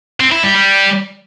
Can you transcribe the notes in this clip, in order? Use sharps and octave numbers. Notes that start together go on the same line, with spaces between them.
C4
E4
G3
G3